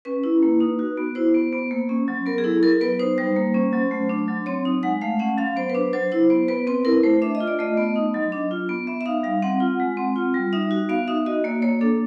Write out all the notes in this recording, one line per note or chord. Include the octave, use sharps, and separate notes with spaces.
C#4 B4
E4
A#3
D#4
F#4
B3
E4 C5
B3
B3
A#3
C#4
F#3
B3 A#4
G#4
E4 A4
F#3 A#4
B3 B4
D#4 C5
G3 C5
A#3
C#4
F#3
A3
D4
F#3
C4 C#5
D#4
G#3 F#5
A3 F5
C#4 F#5
F#3 F5
B3 C5
B4
D4 C5
F#3 C5
E4 C5
B3 C5
B3 B4
C4 B4
E4 A#4
A3 C5
D4 E5
D#5
F4
D5
A3 D#5
B3
D#4
F#3
D4
F4
B3
B3 E5
E5
D#4 F5
G3 F5
C4 F#5
F4
G#3
C4
F4
G3
D#4 E5
F#4
B3 F5
D#4 E5
F#4 D#5
A#3 D5
A#3 C#5
D4 A4